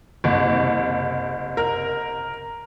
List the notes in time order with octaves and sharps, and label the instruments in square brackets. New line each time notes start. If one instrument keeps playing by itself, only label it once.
[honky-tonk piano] F#1 C2
[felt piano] A#4